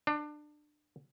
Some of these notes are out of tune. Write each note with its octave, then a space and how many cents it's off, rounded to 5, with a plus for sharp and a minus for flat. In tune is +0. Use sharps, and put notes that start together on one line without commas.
D4 +25